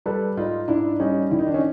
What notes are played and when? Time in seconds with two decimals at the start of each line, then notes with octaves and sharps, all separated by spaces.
0.06 G3 A4 B4
0.37 G#2 D#4 F4
0.68 G#2 D4 E4
1.00 G3 C#4 D#4
1.31 D#3 E4
1.39 D#4
1.47 D4
1.54 C#4 D#4